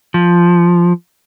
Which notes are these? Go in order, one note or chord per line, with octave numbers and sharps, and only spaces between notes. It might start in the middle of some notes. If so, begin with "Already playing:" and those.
F3